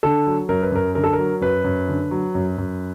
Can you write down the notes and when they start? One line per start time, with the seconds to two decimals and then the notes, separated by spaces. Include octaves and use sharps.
0.03 D3 A4
0.27 F#3
0.49 F#2 A#4
0.62 B4
0.72 F#2 A#4
0.95 D3 A#4
1.04 A4
1.13 A#4
1.19 F#3
1.41 F#2 B4
1.64 F#2
1.88 D3
2.11 F#3
2.35 F#2
2.58 F#2